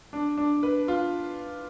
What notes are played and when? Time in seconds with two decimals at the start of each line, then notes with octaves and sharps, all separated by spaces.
0.13 D4
0.37 D4
0.63 B4
0.88 F4